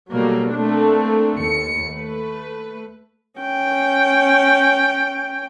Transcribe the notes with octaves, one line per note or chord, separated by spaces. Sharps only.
B2 F#3 G3 A3 A#3
A3 A#3 C4 D4
D#2 C#7
A3 B4
C#4 G5